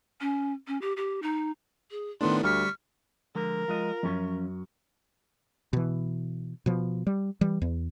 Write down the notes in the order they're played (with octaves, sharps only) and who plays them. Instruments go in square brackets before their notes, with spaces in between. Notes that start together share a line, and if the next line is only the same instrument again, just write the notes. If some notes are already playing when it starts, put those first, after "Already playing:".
[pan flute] C#4
C#4
G4
G4
D#4
G#4
[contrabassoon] A2 [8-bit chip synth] D#3 B3 D4 [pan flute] C6
[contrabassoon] D2 [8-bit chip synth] G3 C#6 B6 [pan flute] F6
[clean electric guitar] D3 F3 G#3 [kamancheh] A#4
[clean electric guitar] F3 G#3 D#5 [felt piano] F4
[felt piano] F#2 C#6 [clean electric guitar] F3 C#4
[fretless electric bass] B2 E3
B2 F3
G3
E3 G3
E2